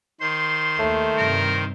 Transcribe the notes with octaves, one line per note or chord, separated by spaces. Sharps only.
D#3 C5 C6
D#2 A3
G2 C3 A#4